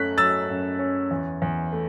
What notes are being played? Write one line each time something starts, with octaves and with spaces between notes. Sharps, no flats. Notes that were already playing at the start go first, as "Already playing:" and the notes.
Already playing: F#2 A3 C#4 F#6 B6
F#3 E6 A6
F#2
C#4
E2
E2
A3